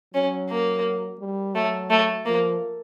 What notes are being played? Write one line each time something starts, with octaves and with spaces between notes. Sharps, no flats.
F#3 C#4
A#3
G3
F#3 A3
A3
F3 A#3